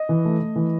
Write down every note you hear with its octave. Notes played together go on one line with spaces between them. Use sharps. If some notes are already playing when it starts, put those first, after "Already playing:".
Already playing: D#5
E3
A3
A3
E3